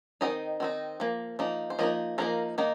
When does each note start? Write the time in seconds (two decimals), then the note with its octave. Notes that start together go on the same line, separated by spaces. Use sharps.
0.21 D#3 C4 D#4 D#5
0.60 D#3 C4 D#4
1.00 F3 A#3
1.39 F3 A#3 D#4
1.70 C5
1.79 F3 A#3 D#4 D#5
2.18 F3 A#3 D#4 A#4
2.58 D#3 A#3 D#4